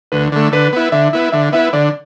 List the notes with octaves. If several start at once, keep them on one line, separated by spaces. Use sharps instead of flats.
D2 B4
D3 A3
D3 B4
B3 E4
D3 E5
B3 E4
D3 E5
B3 E4 E5
D3 D5